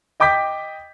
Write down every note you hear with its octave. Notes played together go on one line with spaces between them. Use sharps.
D#5 G5 D6 G6 B6